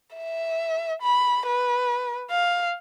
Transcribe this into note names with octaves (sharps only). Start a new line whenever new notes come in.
E5
B5
B4
F5